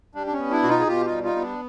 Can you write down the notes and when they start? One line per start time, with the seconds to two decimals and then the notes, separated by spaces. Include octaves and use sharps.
0.15 G3 D4
0.27 D4
0.33 C#4
0.39 B3
0.51 D4 E4
0.63 B2 F#4
0.69 D#4 F4
0.80 G#4
0.87 B2 F4 G4
1.06 D#4 F4
1.11 G3
1.23 D#4 F4
1.35 B3
1.42 D4